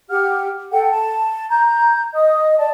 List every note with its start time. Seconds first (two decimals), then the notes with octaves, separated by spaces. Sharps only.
0.09 G4 F#5 F6
0.72 A4 F#5 G5
0.91 A5
1.49 A#5 G6
2.14 D#5 D#6
2.58 D5 A5